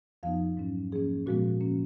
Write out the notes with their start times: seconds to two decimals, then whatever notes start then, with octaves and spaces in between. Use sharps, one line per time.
0.23 F2 F3 B3 D#4 F5
0.57 G#2 F#3 C#4
0.91 G#2 F3 A#3 C#4 G#4
1.26 A#2 F3 G#3 B3 F#4
1.61 F3 A#3 C#4